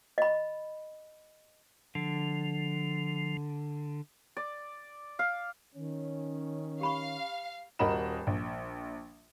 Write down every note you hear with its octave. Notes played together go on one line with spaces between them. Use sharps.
D#5 B5
D3 F3
D5
F5
D#3 C#4
G4 F5 B5 C#6
D#1 F#4 A#4 D#5 B5 E7
A#1